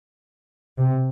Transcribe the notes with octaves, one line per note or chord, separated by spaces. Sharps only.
C3